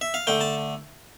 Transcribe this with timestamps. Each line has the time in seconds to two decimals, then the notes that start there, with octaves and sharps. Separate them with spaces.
0.01 E5
0.14 F5
0.27 D3 A3 G5
0.41 A5